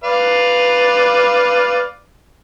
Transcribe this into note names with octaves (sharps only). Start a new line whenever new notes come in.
B4 D5 F5